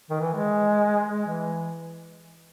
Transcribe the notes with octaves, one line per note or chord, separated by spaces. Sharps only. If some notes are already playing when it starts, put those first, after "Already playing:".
D#3
E3
G#3
G#3
E3